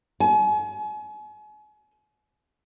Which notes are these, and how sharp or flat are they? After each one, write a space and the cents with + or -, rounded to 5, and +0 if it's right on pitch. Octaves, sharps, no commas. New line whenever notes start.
G#5 +40